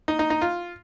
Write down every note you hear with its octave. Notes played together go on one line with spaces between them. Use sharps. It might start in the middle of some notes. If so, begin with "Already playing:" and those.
D#4
D#4
D#4
F4